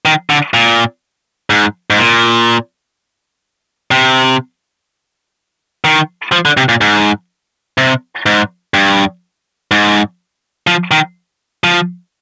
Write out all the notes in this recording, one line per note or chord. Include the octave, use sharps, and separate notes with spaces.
D#3
D3
A#2
G#2
G#2
A#2
C3
D#3
F3
D3
C3
A#2
G#2
C3
G#2
G2
G#2
F3
D#3
F3